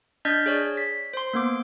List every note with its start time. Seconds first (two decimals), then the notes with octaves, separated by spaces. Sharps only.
0.25 D4 D#5 F6 G6 A6 B6
0.46 G#4 C#5 D5
0.77 B6
1.14 C5 C6
1.34 A#3 B3 D6